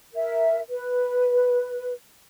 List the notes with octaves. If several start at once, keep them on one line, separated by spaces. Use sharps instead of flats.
A#4 E5
B4